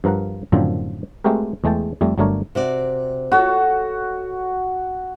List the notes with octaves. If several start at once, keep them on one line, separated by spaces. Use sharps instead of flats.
G2 F3 A#4 F5 F#5
F#2 A2 D3 D#3 F3 C4
G#3 A3 C4 F#4 G4 A#4
E2 G#3 A3 G5 A5
F2 G3 A3
G1 F#3 A3 D4 A#4 C#5
C3 F#4 D5
F#4 A4 C#5